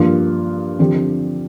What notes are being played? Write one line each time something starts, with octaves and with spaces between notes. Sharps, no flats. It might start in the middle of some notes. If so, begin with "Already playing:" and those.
Already playing: G2 F3 A#3 F4
D3 F3 C4 G4